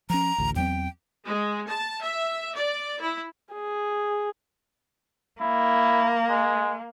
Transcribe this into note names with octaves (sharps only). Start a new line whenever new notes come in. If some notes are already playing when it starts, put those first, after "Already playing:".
F3 C#4 A#5
A1 D2
E2 F#3 C4 G5
G#3
A5
E5
D5
E4
G#4
A#3 E4
G#3